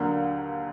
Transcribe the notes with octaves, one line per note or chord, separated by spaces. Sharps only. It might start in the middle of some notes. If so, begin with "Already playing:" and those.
Already playing: D#2 D3 F#3 A#3